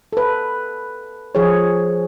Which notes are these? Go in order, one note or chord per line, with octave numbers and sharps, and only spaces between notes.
A4 B4
F3 G#4 C#5